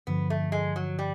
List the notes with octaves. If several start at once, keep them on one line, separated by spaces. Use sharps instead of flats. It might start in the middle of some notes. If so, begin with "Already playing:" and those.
G2 D3 F3 B3
A3
G#3
F#3
G3